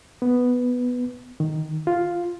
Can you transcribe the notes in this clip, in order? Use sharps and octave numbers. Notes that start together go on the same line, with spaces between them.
B3
D#3
F4